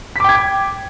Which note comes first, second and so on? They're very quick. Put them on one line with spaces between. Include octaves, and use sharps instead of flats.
B6 D6 G5 G#6